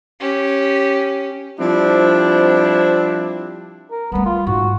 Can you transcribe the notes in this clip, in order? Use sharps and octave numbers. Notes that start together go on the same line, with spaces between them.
C#4 G4
F3 G3 C4 D4 E4
A#4
G3 A3 B3
F4
G#2 F#4